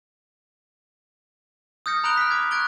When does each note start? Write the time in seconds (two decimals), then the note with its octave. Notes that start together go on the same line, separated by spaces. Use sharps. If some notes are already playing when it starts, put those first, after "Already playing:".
1.86 D#6 F6 G6 A6 A#6 C#7
2.04 A#5 B5 F#6 D7 F7 G7
2.17 F6 F#6 B6
2.31 D6 G#6
2.51 C#6 F#6 G#6 A6 D7 G7